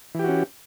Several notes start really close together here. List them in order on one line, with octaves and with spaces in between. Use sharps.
E3 G4 F#4 C#4